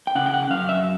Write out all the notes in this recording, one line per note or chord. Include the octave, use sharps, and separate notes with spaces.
G5
C#3 F#5
G5
F#5
F#2 F5
E5